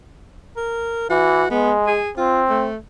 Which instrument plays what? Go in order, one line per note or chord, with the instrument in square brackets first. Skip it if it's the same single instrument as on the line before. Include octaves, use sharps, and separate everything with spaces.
[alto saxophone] A#4
[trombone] E3 [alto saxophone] F#4
[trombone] G#3 [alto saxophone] B3
[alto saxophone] G#4
[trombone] C4 [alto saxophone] F4
[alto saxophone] A3